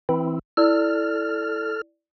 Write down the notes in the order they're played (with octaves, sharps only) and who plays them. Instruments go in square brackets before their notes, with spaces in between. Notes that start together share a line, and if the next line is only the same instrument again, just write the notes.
[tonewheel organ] E3 C4 E4
[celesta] E4 D5 [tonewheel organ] A4 F6